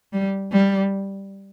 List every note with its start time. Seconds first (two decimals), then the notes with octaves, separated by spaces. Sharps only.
0.13 G3
0.52 G3